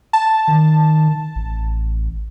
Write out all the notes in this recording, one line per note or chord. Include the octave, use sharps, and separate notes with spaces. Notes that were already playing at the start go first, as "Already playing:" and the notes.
A5
D#3
A1